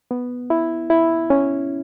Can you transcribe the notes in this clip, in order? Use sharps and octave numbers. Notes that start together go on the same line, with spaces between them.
B3
E4
E4
C#4